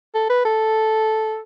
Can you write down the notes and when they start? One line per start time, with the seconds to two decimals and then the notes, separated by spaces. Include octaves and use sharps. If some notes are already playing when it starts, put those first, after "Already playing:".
0.15 A4
0.30 B4
0.45 A4